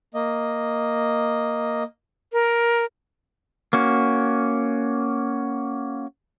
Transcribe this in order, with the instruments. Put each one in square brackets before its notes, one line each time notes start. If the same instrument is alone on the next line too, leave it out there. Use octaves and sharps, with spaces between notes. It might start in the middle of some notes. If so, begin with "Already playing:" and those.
[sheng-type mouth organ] A#3 D#5
[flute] A#4
[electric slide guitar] A#3 C#4 F#4